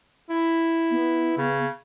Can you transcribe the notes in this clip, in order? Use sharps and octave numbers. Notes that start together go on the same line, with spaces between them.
E4
B3
C#3